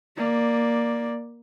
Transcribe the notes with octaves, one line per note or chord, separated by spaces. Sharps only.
A#3 D5